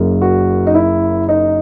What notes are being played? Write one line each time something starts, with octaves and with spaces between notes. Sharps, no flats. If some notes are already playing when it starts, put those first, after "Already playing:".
Already playing: F#1 F#2 C#3
F#4
D#4
E4
D#4